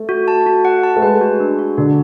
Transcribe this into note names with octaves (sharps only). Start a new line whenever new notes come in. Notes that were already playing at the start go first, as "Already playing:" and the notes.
Already playing: A3
F#4
A5
F#4
F#5
A5
A3
G#3 B4
F#4
D4
F#4
D3 D4